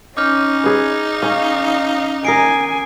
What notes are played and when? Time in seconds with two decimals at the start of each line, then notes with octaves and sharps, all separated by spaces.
0.17 C#4 D#4 D6 F6 G6
0.64 G#4 B4
1.23 C#4 F5
2.25 A#4 D#5 G#5 D#6 C7 D7